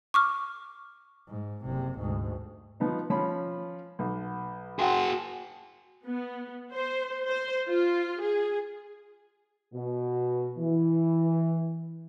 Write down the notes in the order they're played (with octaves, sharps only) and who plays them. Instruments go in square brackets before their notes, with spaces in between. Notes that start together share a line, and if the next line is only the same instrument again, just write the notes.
[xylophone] C#6 D6 F6
[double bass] G#2
F#1 C3
D2 G#2
[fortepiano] F3 B3 D#4
F3 C#4 B5
B1
[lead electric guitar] F#4 G#4 [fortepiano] F#5 G5 C6
[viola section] B3
C5
C5
F4
G#4
[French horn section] B2
E3